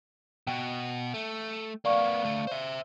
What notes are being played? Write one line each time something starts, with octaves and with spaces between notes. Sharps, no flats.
B2 F#4 G5
A3
A#3 B3 D5 F5 C#6
D2 A3
C5 E5